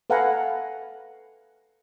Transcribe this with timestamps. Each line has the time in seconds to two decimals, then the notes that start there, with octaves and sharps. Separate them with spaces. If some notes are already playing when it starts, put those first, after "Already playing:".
0.10 A4 B4 F5 F#5 G#5 A#5